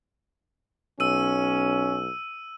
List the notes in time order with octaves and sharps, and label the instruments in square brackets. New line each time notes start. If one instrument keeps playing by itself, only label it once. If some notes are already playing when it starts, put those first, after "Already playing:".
[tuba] B1 [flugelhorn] C#4 [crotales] E6 D#7